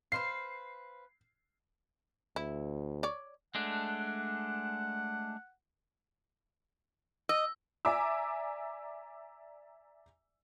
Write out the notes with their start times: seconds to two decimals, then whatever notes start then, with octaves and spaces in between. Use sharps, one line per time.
0.12 B4 C5 F5 C7
2.36 D2 E4
3.03 C#5 D5
3.55 G#3 A3 D4 F#5
7.29 D#5 E6
7.85 D5 E5 G#5 A#5 D6 E6